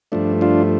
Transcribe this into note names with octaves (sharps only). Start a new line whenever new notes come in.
G2 F3 A3 D4
D4 F4